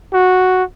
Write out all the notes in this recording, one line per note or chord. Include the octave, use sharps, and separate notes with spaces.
F#4